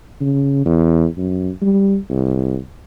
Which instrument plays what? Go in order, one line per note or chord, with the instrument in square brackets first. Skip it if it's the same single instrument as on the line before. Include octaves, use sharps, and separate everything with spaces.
[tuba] C#3
E2
F#2
G3
C2